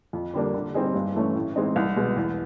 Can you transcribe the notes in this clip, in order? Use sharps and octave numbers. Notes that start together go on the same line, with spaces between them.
F2
D3 G3 A#3 D4
D3
G3 C4 D#4 G#4
G2
E3 A3 C#4
A2
E3 G#3 C4 D#4
C2
B2 G#3
E2